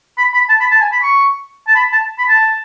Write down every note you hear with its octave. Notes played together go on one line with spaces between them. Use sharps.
B5
B5
A5
B5
A5
G#5
B5
C#6
A5
B5
A5
B5
A5